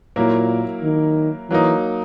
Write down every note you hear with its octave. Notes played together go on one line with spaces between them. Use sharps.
A#2 F#3 A#3 E4 A#4
D#3
E3 F#3 A#3 D#4